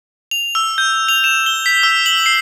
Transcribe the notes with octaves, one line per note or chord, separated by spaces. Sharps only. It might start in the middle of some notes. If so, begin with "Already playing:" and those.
F7
E6
G6
F7
E7
G7
B6
E6
F#7
C7